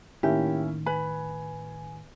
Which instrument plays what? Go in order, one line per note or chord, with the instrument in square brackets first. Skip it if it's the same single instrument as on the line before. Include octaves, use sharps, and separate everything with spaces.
[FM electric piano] A2 D#3 [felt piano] A#3 C#4 E4 [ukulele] G4
[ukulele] B4 B5 [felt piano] G#5